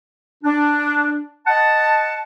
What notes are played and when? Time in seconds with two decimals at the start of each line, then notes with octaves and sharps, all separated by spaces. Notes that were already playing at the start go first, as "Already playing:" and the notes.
0.44 D4
1.47 D#5 F#5 A5